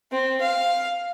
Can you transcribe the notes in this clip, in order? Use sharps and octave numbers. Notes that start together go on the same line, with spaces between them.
C4
F5